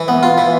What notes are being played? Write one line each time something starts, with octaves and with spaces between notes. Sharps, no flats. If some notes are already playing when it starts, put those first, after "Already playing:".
Already playing: E3
B3
F4
E3